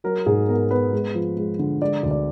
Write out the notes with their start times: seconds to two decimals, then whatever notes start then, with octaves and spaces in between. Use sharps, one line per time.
0.04 F#3 A#4
0.26 G#2 G#4
0.49 B3 A#4
0.71 B3 B4
0.92 G#3
1.15 F3
1.36 G#3
1.59 D3
1.81 G#3 D5
2.03 D2
2.11 D5